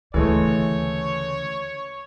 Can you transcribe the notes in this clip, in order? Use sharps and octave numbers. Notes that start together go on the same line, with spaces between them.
D2 C#3 E3 G#3 A3 C#5